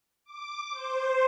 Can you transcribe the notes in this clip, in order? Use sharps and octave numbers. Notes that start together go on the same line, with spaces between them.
D6
C5